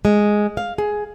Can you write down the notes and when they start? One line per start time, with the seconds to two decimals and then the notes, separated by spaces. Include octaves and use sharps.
0.05 G#3
0.57 F5
0.78 G#4